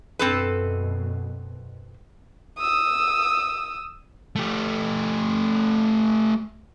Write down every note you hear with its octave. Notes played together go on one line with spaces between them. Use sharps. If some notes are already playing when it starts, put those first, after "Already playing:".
F#2 B2 C4 A4 B4
D#6 E6
A3 G4